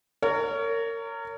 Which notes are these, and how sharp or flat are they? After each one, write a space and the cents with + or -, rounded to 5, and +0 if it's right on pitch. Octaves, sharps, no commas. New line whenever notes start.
A#4 -25 C#5 +20